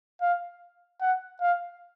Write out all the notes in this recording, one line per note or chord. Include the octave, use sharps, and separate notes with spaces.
F5
F#5
F5